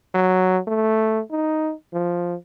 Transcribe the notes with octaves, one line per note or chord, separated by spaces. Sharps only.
F#3
A3
D#4
F3